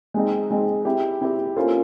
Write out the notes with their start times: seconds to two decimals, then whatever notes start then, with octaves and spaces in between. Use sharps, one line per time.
0.14 G#3 C4 D#4
0.51 G#3 C4 D#4
0.85 C4 E4 G4
1.21 C4 E4 G4
1.56 A#3 C#4 F4 A4 C5